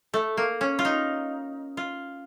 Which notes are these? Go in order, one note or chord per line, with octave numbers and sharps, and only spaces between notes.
A3
A#3
C#4
F4
D#4
F4